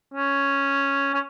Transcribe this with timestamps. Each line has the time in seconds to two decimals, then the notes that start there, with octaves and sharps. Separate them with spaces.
0.14 C#4
1.14 C#4